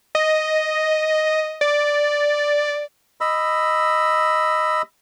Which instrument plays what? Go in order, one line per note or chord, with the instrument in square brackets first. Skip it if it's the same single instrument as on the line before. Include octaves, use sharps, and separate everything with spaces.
[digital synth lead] D#5
D5
[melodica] D#5 B5 E6